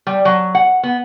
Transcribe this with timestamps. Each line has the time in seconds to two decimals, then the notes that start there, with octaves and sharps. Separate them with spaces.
0.07 G3
0.25 F#3
0.55 F#5
0.83 B3